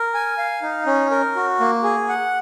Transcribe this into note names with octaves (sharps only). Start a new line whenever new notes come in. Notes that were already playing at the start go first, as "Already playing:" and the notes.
Already playing: A#4
G#5
F5
D#4
C#4
A#4
F#4
A#3
G#4
F#5